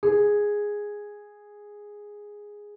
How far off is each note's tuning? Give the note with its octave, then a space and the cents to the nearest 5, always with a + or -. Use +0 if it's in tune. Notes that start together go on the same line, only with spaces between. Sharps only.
G#4 -5